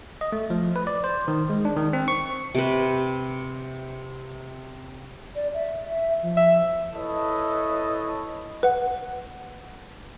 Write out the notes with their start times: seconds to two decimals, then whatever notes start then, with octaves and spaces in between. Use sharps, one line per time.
0.21 D#5
0.32 A3
0.50 F3
0.76 B4
0.87 D5
1.04 C5
1.28 D#3
1.50 G#3
1.65 D4
1.76 D#3
1.93 C4
2.08 C#6
2.55 C3 B4
5.36 D5
5.54 E5
5.89 E5
6.23 F3
6.37 E5
6.93 E4 A4 B4 C#5 D#5 A5
8.63 B4 F#5